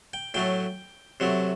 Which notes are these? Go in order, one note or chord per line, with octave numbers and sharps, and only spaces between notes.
G5
A2 F#3 A3 G5
C3 F#3 A3